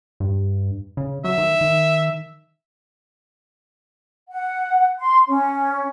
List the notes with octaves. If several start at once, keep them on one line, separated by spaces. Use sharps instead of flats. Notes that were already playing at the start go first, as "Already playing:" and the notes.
G2
C#3
F#3 E5
D#3
D#3
F#5
C6
C#4